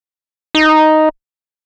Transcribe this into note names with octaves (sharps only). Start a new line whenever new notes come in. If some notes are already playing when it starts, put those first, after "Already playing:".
D#4